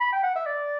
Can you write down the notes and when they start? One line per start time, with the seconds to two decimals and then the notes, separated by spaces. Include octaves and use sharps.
0.01 B5
0.13 G5
0.24 F#5
0.36 E5
0.46 D5